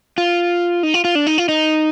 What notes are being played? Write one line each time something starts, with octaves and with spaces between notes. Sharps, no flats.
F4
D#4
F4
F4
D4
D#4
F4
D#4